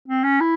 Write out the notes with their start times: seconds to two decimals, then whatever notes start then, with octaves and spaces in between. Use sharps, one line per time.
0.08 C4
0.24 C#4
0.40 E4